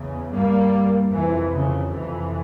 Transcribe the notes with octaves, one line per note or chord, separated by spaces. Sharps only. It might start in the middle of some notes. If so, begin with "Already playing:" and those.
Already playing: E2 C#3
G2 G3 A#3
F2 C3 E3
C#3
F2 C3 E3